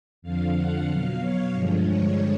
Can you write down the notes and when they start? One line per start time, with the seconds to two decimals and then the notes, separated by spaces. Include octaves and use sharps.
0.22 F2 D3 F3 F5
0.56 F#5
0.87 B2 F#3 F5
1.21 C#5
1.53 G2 D3 F3 G#3
1.86 C#5